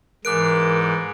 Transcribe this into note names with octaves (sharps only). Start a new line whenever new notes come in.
G#2 E3 A#4 D6 F#6 D7